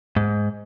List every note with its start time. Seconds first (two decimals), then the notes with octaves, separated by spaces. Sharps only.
0.16 G#2